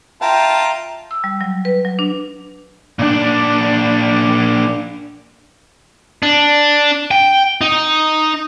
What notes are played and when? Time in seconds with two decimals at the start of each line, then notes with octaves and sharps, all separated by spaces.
0.22 F4 E5 G5 A5 A#5
1.11 E6
1.24 G3
1.41 F#3
1.65 B4
1.85 F#3
1.99 D4
2.99 A#2 D4
6.23 D4
7.11 G5
7.61 D#4